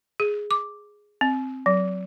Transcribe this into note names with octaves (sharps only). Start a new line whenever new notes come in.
G#4
D6
C4
F#3